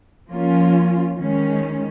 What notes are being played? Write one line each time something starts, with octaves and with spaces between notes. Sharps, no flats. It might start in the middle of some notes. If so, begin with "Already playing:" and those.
F3 A#3 C#4 F4
D#3 G#3 C#4